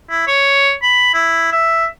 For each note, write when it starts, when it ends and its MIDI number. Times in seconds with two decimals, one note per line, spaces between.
0.10 0.23 64
0.27 0.72 73
0.82 1.09 83
1.14 1.48 64
1.52 1.86 76